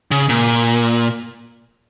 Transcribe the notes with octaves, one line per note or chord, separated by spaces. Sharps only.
C#3
A#2